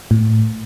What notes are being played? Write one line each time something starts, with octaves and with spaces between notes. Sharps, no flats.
A2